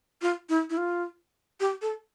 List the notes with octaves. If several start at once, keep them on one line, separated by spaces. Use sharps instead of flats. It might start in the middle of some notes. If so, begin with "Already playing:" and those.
F4
E4
E4
F4
G4
A4